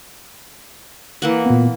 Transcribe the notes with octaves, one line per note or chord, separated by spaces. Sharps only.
E3 A#3 F#5
A#2 B3